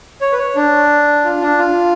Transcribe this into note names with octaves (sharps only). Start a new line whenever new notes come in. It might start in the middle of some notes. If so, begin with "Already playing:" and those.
C#5
B4
C#5
D4
F4
D4
F4